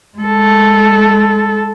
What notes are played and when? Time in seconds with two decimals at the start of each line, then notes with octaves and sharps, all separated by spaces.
0.18 G#3 A4